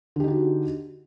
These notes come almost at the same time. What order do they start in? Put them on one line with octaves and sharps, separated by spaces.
D3 G4 D#4 F#4